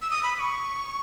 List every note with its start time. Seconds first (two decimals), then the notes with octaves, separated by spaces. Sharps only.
0.02 E6
0.10 D#6
0.23 B5
0.36 D#6
0.40 C#6